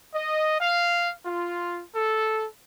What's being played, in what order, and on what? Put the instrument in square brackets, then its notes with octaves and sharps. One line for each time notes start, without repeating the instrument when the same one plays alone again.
[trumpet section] D#5
F5
F4
A4